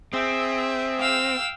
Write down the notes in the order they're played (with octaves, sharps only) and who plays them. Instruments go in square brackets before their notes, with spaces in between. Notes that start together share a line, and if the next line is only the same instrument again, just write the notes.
[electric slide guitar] C4 [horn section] G#4 E5
[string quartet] F5 G5 E6